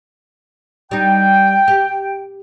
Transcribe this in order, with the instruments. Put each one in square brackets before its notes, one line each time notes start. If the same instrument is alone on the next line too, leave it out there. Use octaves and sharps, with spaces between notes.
[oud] G3 D#4 [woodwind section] G5
[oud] G4